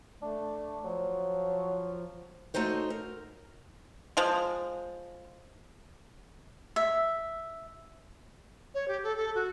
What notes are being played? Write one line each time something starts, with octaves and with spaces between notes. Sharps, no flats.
A3 D4
F3 F#3
A3 D#4 F#4 C5 C#5
A#4
F3 G#3
E5
C#5
G4
A4
A4
F#4